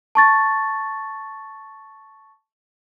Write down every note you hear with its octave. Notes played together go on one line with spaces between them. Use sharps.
A5 C#6 A6